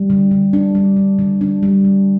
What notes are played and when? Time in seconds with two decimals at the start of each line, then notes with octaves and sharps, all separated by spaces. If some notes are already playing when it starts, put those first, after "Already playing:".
Already playing: G3
0.10 D3
0.31 D3
0.53 D4
0.75 G3
0.97 D3
1.19 D3
1.41 D4
1.63 G3
1.85 D3